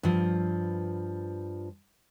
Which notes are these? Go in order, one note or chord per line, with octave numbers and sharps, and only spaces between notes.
G2 F3